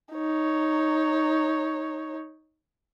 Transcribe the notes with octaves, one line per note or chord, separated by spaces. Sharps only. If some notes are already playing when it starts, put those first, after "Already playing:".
D#4 C#5